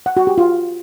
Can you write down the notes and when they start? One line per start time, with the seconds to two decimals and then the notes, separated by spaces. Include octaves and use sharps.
0.06 F#5
0.17 F#4
0.27 G4
0.38 F4